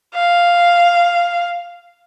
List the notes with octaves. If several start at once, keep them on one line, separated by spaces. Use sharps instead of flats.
F5